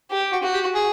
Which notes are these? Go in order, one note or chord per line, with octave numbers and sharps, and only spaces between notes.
G4
F#4
F#4
G4
G#4